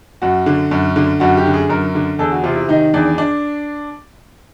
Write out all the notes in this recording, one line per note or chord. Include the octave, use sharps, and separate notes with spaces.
F#2 F#4
D3
F#2
D3
F#2 F#4
G4
D3
G#4
F#2 A#4
D3
E2 A4
F#4
C3 F4
E4
D#3 D#4
E2 D4
D4